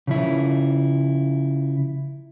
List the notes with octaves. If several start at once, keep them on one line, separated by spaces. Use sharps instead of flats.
C#3 F3 E4